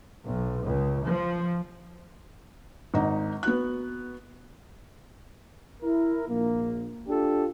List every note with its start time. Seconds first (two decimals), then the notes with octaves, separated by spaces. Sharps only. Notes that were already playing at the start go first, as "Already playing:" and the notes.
0.25 B1
0.64 C#2
1.06 F3
2.94 G#1 D#4
3.43 B3 F#4 F#6
5.82 E4 A#4
6.28 A#1 A#3
7.08 D4 F4 G4 A4